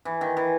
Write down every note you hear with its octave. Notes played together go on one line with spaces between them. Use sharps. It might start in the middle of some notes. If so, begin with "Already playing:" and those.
E3
D#3
E3